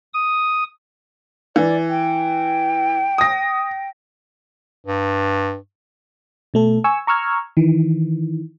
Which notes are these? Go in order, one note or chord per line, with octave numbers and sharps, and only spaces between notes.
D#6
E3 D5
G5
D#6 A#6
G2
B2 A3 A4
G#5 C#6 E6
A#5 C#6 E6 F6 G#6
D#3 E3